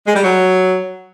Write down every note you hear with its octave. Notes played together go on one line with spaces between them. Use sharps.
G#3
G3
F#3